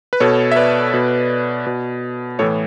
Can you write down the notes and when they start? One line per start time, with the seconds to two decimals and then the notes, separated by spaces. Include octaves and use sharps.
0.13 B4
0.20 B2 A4 C#5
0.52 E5
0.56 B4 D5
0.94 B2
1.66 B2
2.39 A2 E3 A4 C#5